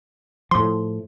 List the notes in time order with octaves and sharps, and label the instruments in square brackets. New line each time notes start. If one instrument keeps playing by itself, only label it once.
[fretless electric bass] A2 F3 [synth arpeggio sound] C6